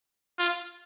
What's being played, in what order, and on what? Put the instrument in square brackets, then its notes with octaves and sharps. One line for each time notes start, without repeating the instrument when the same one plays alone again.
[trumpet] F4